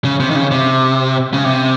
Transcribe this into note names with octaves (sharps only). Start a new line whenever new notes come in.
C#3
C3
D#3
C#3
C3
C#3
C3